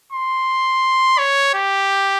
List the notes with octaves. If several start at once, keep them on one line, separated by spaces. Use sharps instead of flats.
C6
C#5
G4